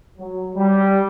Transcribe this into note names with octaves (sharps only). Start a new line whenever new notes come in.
F#3
G3